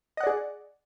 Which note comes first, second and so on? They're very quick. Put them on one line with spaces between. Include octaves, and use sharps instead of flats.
D#5 F#5 D5 G#4